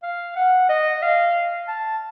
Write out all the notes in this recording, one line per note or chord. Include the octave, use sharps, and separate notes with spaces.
F5
F#5
D#5
F5
A5